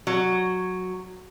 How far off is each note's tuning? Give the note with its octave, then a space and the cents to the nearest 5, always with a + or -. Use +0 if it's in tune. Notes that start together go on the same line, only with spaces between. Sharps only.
F#3 -5